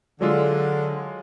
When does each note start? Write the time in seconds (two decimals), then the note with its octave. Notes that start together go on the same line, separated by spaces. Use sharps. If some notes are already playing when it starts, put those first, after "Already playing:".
0.21 D3 F#3 G#3 F4